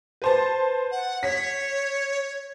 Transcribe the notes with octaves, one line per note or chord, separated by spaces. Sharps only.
B4 C5 A5
F#5
C#5 B6